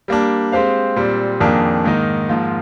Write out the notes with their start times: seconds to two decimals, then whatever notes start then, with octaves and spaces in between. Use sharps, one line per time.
0.08 G3 A#3 D4
0.52 G#3 C4 G4 C5 F5
0.96 A#2 G3 C4
1.40 F2 D#3 A#3 D4 G#4
1.84 G#2 D#3 A#3 D#4
2.29 G#2 F3 A#3 F4